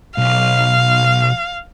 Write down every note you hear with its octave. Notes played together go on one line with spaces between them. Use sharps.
B1 F5